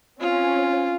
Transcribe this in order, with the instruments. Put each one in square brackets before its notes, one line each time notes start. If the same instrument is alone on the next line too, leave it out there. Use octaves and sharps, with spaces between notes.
[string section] C4 C#4 [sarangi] F4